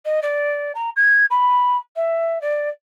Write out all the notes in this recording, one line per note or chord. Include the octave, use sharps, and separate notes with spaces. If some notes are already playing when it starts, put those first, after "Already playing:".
D#5
D5
A#5
G#6
B5
E5
D5